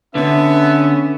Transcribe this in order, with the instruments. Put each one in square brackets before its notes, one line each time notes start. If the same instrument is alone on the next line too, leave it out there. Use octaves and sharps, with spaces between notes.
[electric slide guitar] D3 [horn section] B3 E5 [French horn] C#4